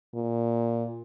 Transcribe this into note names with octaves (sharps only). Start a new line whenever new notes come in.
A#2